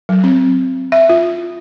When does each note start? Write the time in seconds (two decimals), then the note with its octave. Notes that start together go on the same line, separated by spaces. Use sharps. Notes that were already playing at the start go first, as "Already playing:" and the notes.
0.09 F#3
0.24 C4
0.92 E5
1.09 F4